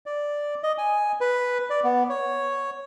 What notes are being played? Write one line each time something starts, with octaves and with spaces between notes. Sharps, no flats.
D5
D#5
G#5
B4
D5
B3
C#5